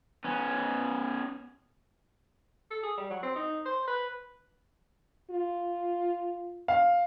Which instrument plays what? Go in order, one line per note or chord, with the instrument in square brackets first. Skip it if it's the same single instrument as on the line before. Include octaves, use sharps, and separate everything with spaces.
[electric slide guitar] B3 C#4
[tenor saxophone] A4
G#4
G3
F#3
C4
D#4
C5
B4
[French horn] F4
[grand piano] F5